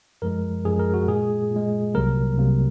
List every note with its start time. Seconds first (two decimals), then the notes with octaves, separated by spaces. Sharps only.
0.22 F#2 F3 G#3 A#4
0.65 F#2 F3 G#3 G#4
0.79 A#4
0.94 F#4
1.08 A#2 G#3 G#4
1.51 A#2
1.56 G#3
1.94 C2 C3 F#3 A#3 A#4
2.37 C2 C3 F#3 A#3